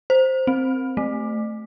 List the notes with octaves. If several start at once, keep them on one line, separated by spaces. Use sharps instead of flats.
C5
C4
A3